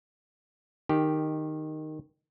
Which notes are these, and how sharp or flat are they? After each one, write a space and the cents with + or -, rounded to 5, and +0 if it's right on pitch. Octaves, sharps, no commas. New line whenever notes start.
D#3 -5 G4 +0